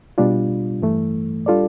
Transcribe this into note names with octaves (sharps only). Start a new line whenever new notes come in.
B2 G3 D4 F4
G2 E3 A3
G3 D4 F4 A4 D5